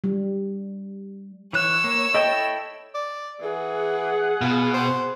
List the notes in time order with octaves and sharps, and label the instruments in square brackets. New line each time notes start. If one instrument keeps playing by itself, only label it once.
[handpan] G3
[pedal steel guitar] E3 F#6 [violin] C#5 E6
[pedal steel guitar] A#3
[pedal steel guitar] E4 A4 G5 [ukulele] D#5
[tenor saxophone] D5
[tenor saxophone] E3 [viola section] G#4 F#5
[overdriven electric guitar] B2 [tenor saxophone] F4
[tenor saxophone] C5